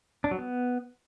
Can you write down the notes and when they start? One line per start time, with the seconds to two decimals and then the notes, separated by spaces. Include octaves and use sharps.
0.24 D4
0.31 F#3
0.39 B3